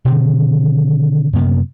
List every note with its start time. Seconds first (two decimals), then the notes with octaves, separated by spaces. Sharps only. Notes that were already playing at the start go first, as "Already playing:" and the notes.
0.05 B2 D3 D#3 C4
1.33 F#2 C3 A#3 B3